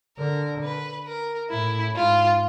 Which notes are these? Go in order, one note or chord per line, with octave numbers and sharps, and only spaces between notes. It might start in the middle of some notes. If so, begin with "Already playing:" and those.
D3 A#4
B4
A#4
A2 E4
G#2 F4